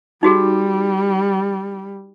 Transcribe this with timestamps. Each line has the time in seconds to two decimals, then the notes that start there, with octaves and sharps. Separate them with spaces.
0.23 G3 D#4 F#4 G#4